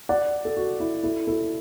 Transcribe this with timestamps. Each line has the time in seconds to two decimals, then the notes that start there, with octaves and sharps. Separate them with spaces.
0.09 D5 F#5
0.45 A4
0.57 F#4
0.80 E4
1.03 E4 A4
1.27 E4 A4